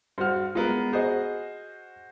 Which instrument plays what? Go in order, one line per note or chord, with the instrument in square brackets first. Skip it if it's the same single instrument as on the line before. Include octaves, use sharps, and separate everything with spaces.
[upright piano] G2 F6 [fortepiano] F#4 C5
[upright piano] G#3 B3 A#4 [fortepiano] F4
[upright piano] F#4 C5 [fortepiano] G#4 D#5